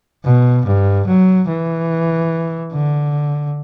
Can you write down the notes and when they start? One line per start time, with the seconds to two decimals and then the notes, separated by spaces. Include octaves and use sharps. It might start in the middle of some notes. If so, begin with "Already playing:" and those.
0.25 B2
0.66 G2
1.07 F#3
1.49 E3
2.73 D3